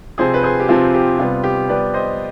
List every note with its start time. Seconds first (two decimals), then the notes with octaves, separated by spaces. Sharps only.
0.18 C3 F3 C4 G#4 C5
0.34 B4
0.43 G#4 C5
0.60 G4
0.68 C3 F3 C4 F4
0.94 G4
1.19 C3 G3 B3 F4
1.44 G4
1.69 C3 G3 B3 B4 D5
1.94 C5 D#5